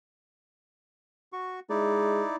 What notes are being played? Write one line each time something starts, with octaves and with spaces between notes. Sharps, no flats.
F#4 C#6
G#3 D#4 E4 D5